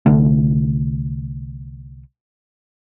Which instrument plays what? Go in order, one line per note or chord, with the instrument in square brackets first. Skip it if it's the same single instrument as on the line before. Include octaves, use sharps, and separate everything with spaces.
[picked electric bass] C2 D3 A3